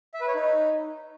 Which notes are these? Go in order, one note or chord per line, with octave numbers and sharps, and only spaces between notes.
E5
B4
C#5
D#4